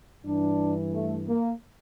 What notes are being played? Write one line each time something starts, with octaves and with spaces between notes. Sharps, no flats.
G2 E3 D4
A3
A#3